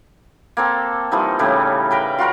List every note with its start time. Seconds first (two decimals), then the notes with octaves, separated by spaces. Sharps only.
0.57 A#3 C4 A4
1.12 E3 F3 G3 D#4
1.39 A2 C#3 G3
1.91 A#4 B4 G5
2.19 F4 F#4 A#4 F#5